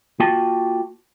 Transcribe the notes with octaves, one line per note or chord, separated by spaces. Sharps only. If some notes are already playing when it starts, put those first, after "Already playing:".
A#3 F4 F#4 G5 A5